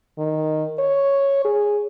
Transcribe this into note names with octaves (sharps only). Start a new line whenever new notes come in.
D#3
C#5
G#4